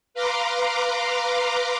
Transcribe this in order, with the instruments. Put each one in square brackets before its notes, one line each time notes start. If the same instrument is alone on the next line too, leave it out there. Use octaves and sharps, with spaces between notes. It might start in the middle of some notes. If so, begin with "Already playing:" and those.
[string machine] B4 F5 A#5 C6 D6